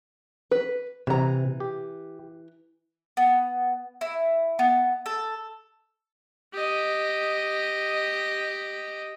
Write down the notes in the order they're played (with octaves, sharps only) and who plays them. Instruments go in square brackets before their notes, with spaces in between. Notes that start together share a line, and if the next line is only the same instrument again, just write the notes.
[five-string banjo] B4
[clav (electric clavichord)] C3 [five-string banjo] E3 A#5
[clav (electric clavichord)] G4
[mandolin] B3
E4
B3
A4
[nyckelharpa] G4 D#5